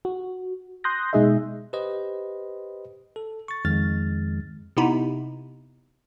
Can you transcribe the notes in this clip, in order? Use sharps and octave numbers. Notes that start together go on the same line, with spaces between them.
F#4
C6 D#6 F#6 G6 A#6
B2 G#3 D#4 G#4 D#5 E5
G4 B4 C5 D#5
A4
C#6 A6
F2 D#3 G#3 F6 A6
C3 B3 D#4 E4